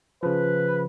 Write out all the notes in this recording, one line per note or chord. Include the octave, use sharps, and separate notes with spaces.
C#3 F3 B4